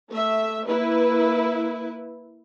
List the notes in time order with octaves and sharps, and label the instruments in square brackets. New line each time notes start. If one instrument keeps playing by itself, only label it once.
[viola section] A3 E5
A#3 E4 B4